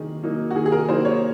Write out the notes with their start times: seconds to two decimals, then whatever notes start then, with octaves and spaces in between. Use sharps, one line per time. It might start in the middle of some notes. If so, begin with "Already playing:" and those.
Already playing: D#3 F#3 A#3 D#4 G#4
0.23 F#3 A#3 D#4
0.51 F#4
0.55 D#3 G#4
0.66 G#4
0.72 A#4
0.88 F#3 A#3 D#4 C5
1.05 C#5